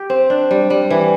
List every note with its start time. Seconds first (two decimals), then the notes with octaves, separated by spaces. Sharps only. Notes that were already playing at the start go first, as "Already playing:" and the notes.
Already playing: G4
0.10 C4
0.30 D4
0.51 G3
0.70 G3
0.90 E3